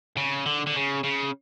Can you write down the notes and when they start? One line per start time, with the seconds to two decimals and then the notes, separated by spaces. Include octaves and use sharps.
0.17 C#3
0.46 D3
0.66 D3
0.75 C#3
1.03 C#3